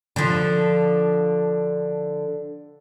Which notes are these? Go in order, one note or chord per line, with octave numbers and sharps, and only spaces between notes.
D3 F3